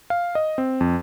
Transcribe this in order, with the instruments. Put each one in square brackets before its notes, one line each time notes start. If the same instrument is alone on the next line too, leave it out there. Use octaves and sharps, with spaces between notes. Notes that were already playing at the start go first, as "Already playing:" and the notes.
[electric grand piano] F5
D#5
C4
F2